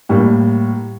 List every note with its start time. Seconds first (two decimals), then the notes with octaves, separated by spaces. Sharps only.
0.09 A2 G3 A#3